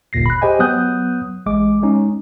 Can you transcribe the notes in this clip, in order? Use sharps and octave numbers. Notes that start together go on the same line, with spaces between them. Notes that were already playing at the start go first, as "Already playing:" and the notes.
G1 D#2 A#2 A#6 C7
B5 F#6
G4 G#4 C5 D#5 G5 G#5
F#3 B3 D#6 F#6 G6
A1 G#3 D6
G#3 C#4 D#4